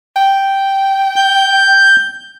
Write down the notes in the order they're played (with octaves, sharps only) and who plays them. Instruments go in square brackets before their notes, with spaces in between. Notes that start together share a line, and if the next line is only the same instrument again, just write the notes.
[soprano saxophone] G5
[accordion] G6